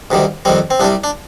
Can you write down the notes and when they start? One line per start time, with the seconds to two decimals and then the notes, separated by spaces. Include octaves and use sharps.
0.11 D2 C3 D#3 G3
0.45 F2 D#3 G3 C4
0.70 C4
0.80 C2 C3 G3 D4
1.04 D4